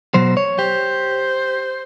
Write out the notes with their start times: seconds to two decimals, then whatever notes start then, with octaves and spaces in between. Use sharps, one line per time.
0.14 B2 F#3 C5
0.37 C#5
0.59 G4 C5